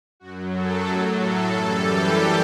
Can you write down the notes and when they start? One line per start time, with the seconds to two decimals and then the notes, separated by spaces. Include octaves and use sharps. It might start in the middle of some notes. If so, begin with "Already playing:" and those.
0.20 F#2 F#3 F#4
0.53 A4
0.85 A2 F#3 G4
1.19 A4
1.52 F#2 E3 G3 A4
1.85 G4